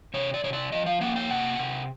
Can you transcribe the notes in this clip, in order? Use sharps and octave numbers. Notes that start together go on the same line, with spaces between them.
C3 C#5
D5
C3 C#5
D5
F3 D#5
F5
A#3 F#5
G5
C3 F#5
C3